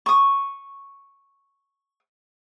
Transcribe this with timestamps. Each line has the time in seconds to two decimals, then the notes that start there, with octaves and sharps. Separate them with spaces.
0.06 C#6 D#6